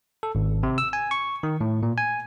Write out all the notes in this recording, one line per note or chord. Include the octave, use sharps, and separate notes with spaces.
A4
G#1
C3
E6
G#5
C#6
D#3
A2
A#2
G#5